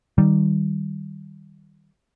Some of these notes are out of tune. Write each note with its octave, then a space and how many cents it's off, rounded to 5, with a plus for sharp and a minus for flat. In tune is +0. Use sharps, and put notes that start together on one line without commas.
D#3 +0 G3 -10